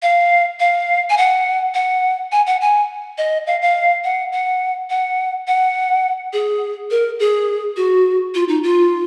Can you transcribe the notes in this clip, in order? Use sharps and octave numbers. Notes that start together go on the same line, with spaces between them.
F5
F5
G#5
F#5
F#5
G#5
F#5
G#5
D#5
F5
F5
F#5
F#5
F#5
F#5
G#4
A#4
G#4
F#4
F4
D#4
F4